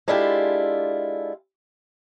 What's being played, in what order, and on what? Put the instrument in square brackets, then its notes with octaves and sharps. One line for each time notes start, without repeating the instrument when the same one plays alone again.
[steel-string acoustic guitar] G#3 D4 E4 F4 G4 A4